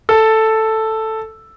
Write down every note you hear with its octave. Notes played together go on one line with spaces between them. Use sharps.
A4